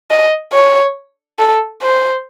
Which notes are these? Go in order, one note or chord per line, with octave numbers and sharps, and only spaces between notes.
D#5
C#5
A4
C5